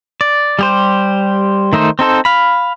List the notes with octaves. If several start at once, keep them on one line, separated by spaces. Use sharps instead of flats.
D5
G3 G4 C5
D#3 A3 D#4 C5
C4 D#4 A4 C5
F5 B5